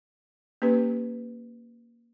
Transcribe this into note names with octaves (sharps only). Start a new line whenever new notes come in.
A#3 C#4 G4 B4